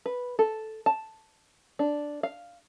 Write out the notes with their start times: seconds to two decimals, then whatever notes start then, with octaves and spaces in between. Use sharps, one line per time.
0.06 B4
0.39 A4
0.86 A5
1.79 D4
2.23 F5